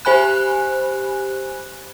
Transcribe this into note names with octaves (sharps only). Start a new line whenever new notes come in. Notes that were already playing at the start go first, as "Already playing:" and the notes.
G4 C5 G#5 B5 F#6